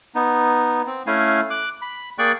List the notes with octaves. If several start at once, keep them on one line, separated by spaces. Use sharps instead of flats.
B3 D#4
C4
A3 C#4 E4 F5 G#5
D6 F#6
B5
A#3 G#4 D5 G5 C#6 F#6